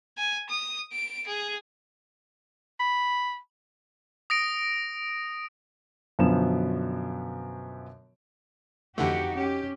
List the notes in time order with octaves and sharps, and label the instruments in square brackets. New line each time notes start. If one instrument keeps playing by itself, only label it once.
[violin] G#5
D#6
D7
G#4
[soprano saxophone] B5
[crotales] D#6 A#6 D7
[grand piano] F#2 B2 D3 F3 B3 E7
[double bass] F2 [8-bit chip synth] D3 E3 A3 [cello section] D#4 F#4 G4 [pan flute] F#5
[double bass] C#4 [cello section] G4